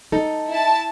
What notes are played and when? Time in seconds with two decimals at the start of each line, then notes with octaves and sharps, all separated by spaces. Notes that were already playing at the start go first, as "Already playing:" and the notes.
0.12 D#4 A4
0.50 E4 A5